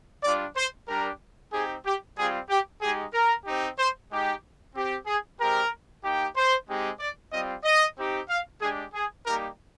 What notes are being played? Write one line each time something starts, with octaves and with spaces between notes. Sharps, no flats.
G3 D4 F4 D5
C5
G3 D4 G4 A#4
C4 D#4 G4 G#4
G4
G3 C4 F4 G#4
G4
G#3 D#4 G4 G#4
A#4
C4 D#4 G4
C5
G#3 D#4 G4
C4 G4
G#4
G#3 C4 G4 A#4
A#3 D#4 G4
C5
G#3 C4 D#4 G4
D5
G3 C4 F4 D#5
D#5
C4 D#4 G4
F5
G#3 D4 G4 G#4
G#4
G3 A#3 D#4 G4 A#4